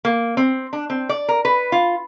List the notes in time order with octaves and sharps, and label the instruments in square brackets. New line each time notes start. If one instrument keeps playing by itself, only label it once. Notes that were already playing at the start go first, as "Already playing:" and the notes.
[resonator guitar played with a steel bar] A#3
C4
D4
C4
D5
A#4
B4
F4